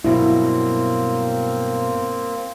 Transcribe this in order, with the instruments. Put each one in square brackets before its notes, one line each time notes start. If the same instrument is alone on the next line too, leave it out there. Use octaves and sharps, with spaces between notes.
[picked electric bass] G2 B2 F#3 [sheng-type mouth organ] A#3 C4 [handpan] E4